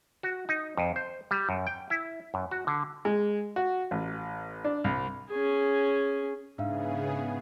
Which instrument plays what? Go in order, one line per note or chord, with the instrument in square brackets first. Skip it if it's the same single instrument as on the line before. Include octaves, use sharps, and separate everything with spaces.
[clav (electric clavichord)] F#4
D#4
F2
C5
G3
F#2
G5
E4
F#2
F#4
D3
[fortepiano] G#3
F#4
A1
D4
C2
[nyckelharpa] C#4 G#4
[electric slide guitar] G#2 [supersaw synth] C#3 B3 G#4 [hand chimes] D4 E5 F5